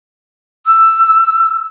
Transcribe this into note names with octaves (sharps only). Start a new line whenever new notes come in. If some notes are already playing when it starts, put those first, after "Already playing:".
E6